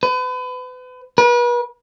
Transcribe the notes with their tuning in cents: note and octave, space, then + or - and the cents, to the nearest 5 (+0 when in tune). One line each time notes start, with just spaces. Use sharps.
B4 +35
B4 -40